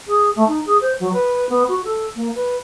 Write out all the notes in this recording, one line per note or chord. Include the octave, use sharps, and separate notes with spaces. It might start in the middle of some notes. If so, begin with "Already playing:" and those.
G#4
A3
D#4
G#4
C5
F#3
B4
B3
F#4
A4
A#3
B4